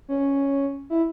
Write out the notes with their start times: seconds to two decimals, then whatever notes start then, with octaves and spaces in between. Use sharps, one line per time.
0.09 C#4
0.90 E4